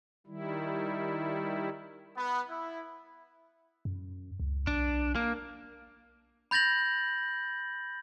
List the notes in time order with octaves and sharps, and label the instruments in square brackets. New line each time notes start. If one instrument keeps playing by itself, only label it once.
[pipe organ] D#3 G3 E4
[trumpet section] B3
E4
[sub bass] F#2
C#2
[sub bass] B1 [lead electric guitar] D4
[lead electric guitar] A#3
[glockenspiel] B5 G6 A6 A#6 F#7